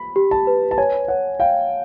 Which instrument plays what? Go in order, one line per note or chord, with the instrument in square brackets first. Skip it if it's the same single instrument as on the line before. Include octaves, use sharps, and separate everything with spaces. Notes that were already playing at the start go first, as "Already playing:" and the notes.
Already playing: [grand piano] B5
[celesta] G4
[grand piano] A5
[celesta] B4
[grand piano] A5
[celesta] C#5 [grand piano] G#5
[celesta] C#5 [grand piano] F#5
[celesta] F5 [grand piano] G5